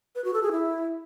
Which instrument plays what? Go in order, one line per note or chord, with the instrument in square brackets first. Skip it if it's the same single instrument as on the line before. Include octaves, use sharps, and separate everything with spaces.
[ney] B4
F#4
A4
G#4
E4